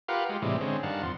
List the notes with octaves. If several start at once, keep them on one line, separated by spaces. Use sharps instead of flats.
F4 G4 A#4 B4 F5 F#5
G#3 F4 G4
A2 C3 E3 G3 G#3
D3 G#3 C4 C#4
G2 D#3 F5 F#5 A5
F2 C6